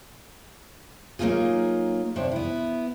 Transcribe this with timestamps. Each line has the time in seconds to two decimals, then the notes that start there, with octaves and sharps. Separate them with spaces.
1.19 F#3 A#3 B3 D#4 F4 G#4
2.16 C3 F3 D4 C#5
2.32 B3 E4